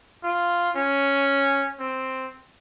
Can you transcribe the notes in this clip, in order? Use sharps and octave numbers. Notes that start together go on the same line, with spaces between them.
F4
C#4
C4